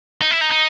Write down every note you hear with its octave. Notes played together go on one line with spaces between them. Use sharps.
D#4
E4
D#4
D#4